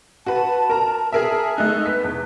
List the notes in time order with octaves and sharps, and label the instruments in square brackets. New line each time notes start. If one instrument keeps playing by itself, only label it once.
[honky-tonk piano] F#4 B4 [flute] A5
[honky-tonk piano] A#4 A#5
[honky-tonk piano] G#4 A#4 E5 [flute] A5
[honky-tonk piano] G#3 A3 D#4 [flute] F#6
[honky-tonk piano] B3 B6
E2